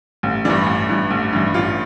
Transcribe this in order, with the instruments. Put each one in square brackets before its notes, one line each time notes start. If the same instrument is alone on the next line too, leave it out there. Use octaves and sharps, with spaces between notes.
[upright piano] A1
G2 E3 D4
A1
G2 E3
A1
G2 E3
A1 F4